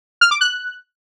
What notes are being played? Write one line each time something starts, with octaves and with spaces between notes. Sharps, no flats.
F6
D6
F#6